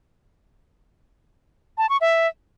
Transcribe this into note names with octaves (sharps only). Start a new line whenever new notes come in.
A5
C#6
E5